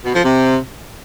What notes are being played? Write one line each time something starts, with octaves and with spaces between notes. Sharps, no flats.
B2
F3
C3